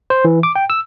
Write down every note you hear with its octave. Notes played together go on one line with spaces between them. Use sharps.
C5
E3
D6
G5
E6